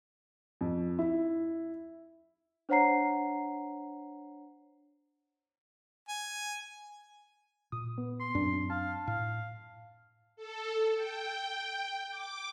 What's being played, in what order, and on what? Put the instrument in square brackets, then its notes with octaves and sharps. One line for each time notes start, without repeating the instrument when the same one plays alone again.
[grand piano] F2
E4
[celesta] D4 C5 C#5 F#5 A#5 C7
[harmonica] G#5
[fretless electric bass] A#2 [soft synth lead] D#6
[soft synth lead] B3
[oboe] C6
[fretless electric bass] F#2 C4 [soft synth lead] D4
[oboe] F5 [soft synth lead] A5
[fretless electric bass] A2 [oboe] F5
[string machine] A4
G5
D6